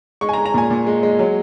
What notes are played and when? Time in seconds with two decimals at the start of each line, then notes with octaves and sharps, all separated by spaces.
0.21 G#3 C#6
0.29 G#5
0.33 A#5
0.37 G#3
0.46 A#5
0.54 A#2 G#5
0.70 A#2
0.87 G#3
1.03 G#3
1.19 F#3